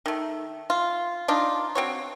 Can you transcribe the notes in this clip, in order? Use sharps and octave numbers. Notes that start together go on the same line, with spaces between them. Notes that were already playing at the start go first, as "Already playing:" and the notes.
D#3 A3
F4
D4 D#4 F4
C4 F#4 C#5